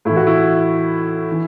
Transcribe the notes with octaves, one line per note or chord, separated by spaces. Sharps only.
A2 E3 E4
F#4
E4
E3